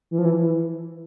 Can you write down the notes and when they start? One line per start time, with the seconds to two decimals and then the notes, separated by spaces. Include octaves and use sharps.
0.11 E3
0.18 F3
0.25 E3
0.41 E3